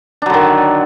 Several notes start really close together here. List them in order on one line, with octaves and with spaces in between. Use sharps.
D4 F#3 D3 D#3